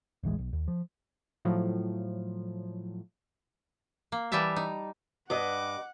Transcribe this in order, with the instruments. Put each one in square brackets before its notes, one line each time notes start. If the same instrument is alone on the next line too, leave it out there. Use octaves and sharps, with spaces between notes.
[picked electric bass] D#1 A1 E3 G#3
B1
D#2
F3
[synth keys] A2 F3 F#3
[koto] A#3
E3 G3 D5 E5 A5
D#4
[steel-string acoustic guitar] G2 B4 D#5 [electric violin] F#5 [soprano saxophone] D6